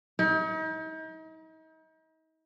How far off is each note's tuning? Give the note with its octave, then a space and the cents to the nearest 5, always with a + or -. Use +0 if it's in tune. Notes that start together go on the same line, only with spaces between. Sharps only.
D#4 +40